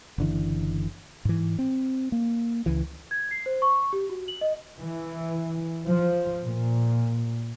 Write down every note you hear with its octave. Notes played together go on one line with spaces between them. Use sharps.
F#1 D3 E3
G#2 E3
C4
A#3
C#2 E3
G#6
C7
C5
C#6
C#6
G4
F#4
F#7
D#5
E3
F3
A#2